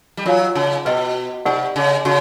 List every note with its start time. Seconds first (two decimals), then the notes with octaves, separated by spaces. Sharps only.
0.17 G3
0.26 F#3 F4 A#4 C#5 F5 G#5
0.56 C#3
0.85 B2 B4 D#5 G5
1.45 C3 D#4 G4 A#4 D5 F#5
1.76 C#3
2.05 C#3 F#4